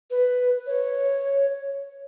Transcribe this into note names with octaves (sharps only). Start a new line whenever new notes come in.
B4
C#5